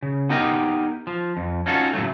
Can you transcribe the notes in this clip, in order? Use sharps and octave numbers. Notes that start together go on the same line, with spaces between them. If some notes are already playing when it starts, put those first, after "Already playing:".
C#3
B3 D#4 G4 A#4 D#5
F3
F2
C#4 D#4 F4 F#4 A4
A2 C#3 F#3 A3